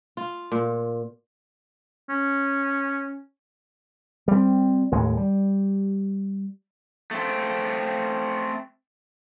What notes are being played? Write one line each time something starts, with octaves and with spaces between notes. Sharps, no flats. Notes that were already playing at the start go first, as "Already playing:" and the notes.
F4
A#2
C#4
G3 C4
D#2 A2 G#3
G3
A3 C4